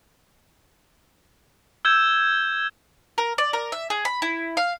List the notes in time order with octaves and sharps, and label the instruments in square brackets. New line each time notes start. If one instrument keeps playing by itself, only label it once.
[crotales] E6 G6 G#6 E7
[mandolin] A#4
D5
A#4
E5
G#4
B5
E4
F5